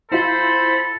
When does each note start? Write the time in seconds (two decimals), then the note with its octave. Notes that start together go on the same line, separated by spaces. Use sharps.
0.12 C4 E4 F4 A4 C5 B5